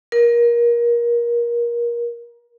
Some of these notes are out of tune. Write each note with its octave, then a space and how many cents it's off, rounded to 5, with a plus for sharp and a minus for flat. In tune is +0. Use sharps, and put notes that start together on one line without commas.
A#4 +25